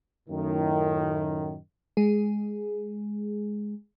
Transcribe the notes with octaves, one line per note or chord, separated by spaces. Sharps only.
F#2 A2 D#3
G#3 G#4